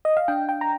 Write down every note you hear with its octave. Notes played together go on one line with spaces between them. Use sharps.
D#5
F5
D4 G5
G5
A#5